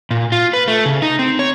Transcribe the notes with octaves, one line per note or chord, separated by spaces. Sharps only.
A#2
F4
B4
A3
C#3
D#4
C4
C#5